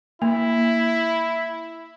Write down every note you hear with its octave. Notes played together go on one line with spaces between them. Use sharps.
A#3 E4